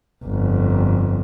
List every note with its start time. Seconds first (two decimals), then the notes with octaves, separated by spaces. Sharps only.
0.24 G1 F2